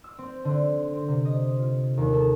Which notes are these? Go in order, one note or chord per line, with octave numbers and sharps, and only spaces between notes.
E6
C4
D3
C4
C3
D#5
F4
D#2
A4